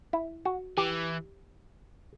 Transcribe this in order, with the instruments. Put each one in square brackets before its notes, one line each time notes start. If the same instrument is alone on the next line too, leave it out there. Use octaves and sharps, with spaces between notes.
[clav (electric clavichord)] E4
F#4
[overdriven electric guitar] E3 [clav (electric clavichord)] G4